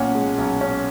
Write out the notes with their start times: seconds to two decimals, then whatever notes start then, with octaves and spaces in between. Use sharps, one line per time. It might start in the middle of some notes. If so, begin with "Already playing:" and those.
Already playing: B1 A#2 C#4 F#5
0.15 G#3
0.38 B1
0.61 C#4